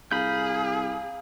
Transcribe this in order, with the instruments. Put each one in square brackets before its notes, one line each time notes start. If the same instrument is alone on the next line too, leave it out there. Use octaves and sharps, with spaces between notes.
[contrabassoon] C2 [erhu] G#4 [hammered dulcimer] F5 A#5 [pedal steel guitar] B5 G6